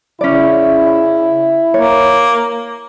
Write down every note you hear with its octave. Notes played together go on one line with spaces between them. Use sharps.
C#3 C#4 E4 D5
A#3 C#5